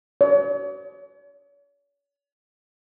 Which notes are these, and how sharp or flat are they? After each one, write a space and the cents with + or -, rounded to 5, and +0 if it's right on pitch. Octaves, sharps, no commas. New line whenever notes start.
C#5 +40